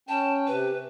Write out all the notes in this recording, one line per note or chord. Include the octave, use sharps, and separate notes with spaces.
C#4 G5 A5
C3 B4